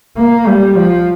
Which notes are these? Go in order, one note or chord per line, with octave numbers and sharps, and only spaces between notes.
A#3
G3
F3